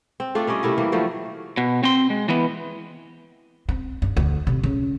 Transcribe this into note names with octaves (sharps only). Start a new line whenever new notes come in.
C4
A3 D4 F4 A4
G3 C#4 D5 D#5
C3 A3 E4 A#4
E3 G3 A#3
D#3 F3 F#3 A3
B2
C4 C6
G#3
E3 B3
C4
G2
D2
C3
C#3